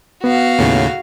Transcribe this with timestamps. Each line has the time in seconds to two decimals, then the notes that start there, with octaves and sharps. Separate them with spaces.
0.24 B3 F#4 F5
0.59 D#2 A2 C#3